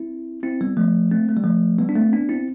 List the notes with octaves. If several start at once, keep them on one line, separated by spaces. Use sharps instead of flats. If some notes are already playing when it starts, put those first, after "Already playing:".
Already playing: C4 E4
C4 E4
G3 B3
F3 A3
A3 C4
A3
G3
F3 A3
G3 B3
D4
A3 C4
B3 D4
C4 E4